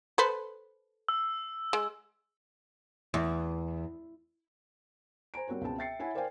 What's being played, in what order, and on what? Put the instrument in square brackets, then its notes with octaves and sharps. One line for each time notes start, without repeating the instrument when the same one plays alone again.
[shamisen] A4 B4 C5
[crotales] E6
[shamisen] G#3
[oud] E2
[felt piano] C5 G#5 A#5 D7
G3 C4 F#4 A#4 C#5
C#2 B2 B3 C4 A5
E5 G5 A6 C7 C#7
E4 C#5 E5 F#5 G#5
A#4 C5 D5 F5 G5 G#5